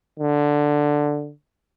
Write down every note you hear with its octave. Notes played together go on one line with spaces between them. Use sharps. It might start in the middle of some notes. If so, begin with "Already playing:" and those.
D3